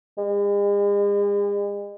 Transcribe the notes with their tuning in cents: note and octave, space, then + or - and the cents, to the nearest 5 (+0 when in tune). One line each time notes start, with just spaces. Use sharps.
G#3 -45